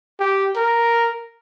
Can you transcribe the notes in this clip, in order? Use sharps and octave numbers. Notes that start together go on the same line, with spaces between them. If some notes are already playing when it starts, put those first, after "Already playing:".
G4
A#4